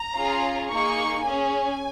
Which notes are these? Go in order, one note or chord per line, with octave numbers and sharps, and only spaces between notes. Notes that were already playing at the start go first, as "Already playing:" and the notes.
Already playing: A#5
C#4 F4 G#4
A#3 D#4 G#4 C#6
C#4 G#4 G#5